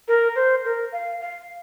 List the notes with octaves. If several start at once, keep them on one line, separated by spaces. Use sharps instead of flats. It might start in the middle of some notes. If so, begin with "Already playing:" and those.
A#4
C5
A#4
F5
F5